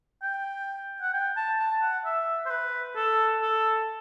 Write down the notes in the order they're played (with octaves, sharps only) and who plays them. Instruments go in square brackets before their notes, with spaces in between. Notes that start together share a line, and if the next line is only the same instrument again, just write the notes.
[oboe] G5
F#5
G5
A5
A5
F#5
E5
C5
B4
A4
A4